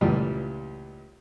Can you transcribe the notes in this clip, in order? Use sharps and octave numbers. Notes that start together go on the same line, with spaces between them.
C#2 A#2 E3 G3 A3